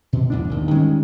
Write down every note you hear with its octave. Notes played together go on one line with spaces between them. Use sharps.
B2
A#1 E2 D4
G#1 D#2
D#3 G3 G#3 C#4